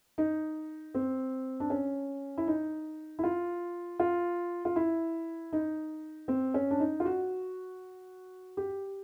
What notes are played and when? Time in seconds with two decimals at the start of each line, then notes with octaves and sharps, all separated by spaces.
0.18 D#4
0.95 C4
1.60 D4
1.70 C#4
2.38 E4
2.47 D#4
3.19 E4
3.23 F4
3.99 F4
4.65 F4
4.76 E4
5.53 D#4
6.28 C4
6.54 C#4
6.71 D4
6.80 D#4
7.00 F4
7.05 F#4
8.57 G4